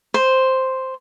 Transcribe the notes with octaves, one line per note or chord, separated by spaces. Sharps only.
C5